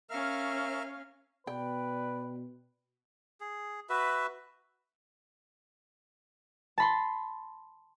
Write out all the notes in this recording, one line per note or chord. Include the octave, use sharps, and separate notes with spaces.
C#4 A#4 E5 F5 F6
B2 B4 D5 G5
G#4
F#4 B4 E5
A5 B5 C6